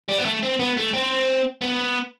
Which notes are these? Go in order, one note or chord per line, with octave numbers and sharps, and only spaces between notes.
G3
B3
A3
C4
B3
A3
C4
B3